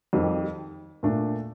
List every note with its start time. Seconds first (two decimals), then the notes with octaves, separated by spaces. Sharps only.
0.13 F2 D#3 G3 C4 G4
1.03 A#2 A3 D4